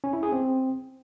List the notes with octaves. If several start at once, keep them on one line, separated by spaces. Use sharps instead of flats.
C#4
E4
G#4
C4